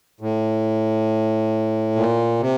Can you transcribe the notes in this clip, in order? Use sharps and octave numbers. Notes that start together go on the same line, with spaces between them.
A2
A#2
C3